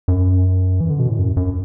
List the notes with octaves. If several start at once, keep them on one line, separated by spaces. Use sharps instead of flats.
F#2
E3
D3
B2
A2
F#2
F#2